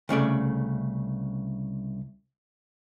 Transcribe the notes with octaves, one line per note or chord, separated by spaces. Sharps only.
C2 C#3 A3 D5